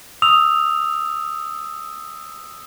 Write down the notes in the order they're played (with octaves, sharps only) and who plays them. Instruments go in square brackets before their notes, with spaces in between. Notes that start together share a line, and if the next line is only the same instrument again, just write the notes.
[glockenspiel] D#6 E6 F7